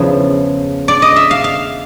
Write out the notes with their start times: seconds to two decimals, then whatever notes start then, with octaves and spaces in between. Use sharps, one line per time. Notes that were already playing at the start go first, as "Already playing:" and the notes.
Already playing: E2 C#3 F3 E5
0.88 D5
1.02 D#5
1.16 E5
1.31 F5
1.44 F5